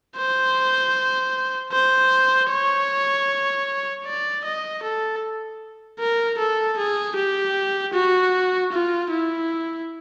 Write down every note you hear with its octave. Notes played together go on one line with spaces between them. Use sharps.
C5
C5
C#5
D5
D#5
A4
A#4
A4
G#4
G4
F#4
F4
E4